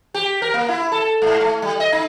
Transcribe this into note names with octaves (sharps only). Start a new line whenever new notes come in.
G4
A#4
A#3
E4
A4
G#2
A3
G3
D#5
D#4